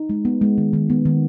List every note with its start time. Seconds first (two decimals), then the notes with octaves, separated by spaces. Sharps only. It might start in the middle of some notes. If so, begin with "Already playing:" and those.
Already playing: D#4
0.10 G#3
0.25 B3
0.41 G#3
0.58 D#3
0.73 D#3
0.90 B3
1.05 D#3